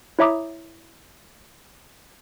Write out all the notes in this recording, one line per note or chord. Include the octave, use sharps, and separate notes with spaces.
E4 C#5 E5 A#5 D6 D#6